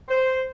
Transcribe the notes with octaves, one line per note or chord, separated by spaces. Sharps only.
C5